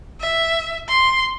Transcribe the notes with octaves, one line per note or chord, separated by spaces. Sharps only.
E5
C6